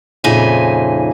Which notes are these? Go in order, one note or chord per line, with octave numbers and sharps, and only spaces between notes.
F2 A#2 C#3 D#4 E5 G#5